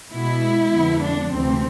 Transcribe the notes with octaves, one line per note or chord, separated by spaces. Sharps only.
B2 G#3 B3 E4
F2 D3 G#3 B3
D4
D2 C3 E3 C4